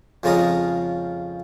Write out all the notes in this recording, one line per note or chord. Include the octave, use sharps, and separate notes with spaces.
F2 C#3 F3 G#3 A#5 D#6